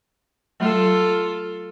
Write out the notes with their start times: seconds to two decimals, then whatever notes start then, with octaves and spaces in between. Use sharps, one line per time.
0.60 F#3 A3 F4 A4